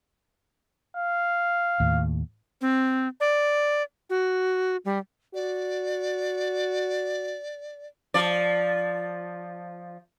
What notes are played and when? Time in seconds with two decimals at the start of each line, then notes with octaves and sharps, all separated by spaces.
0.96 F5
1.80 D#2 A2
2.61 C4
3.20 D5
4.10 F#4
4.85 G3
5.34 F#4 D5
8.14 F3 D5